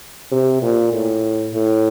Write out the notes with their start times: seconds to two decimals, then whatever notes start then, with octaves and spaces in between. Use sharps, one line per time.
0.32 C3
0.62 A#2
0.93 A2
1.54 A2